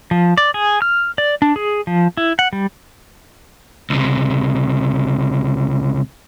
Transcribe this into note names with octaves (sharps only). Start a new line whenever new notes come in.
F3
D5
G#4
F6
D5
D4
G#4
F3
E4
F#5
G3
C#2 C3